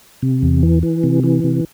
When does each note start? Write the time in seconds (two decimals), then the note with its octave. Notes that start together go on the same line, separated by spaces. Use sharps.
0.22 C3
0.43 E2
0.63 E3
0.83 E3
1.03 C3
1.24 E3
1.44 C3